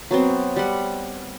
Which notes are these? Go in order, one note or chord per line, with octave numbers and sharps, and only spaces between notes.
F#3 B3 C4
G3 F#5